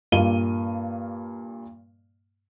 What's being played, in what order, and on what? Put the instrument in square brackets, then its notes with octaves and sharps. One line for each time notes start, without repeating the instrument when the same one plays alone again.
[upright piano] G2 A#2 A#3 F5 D#7 G7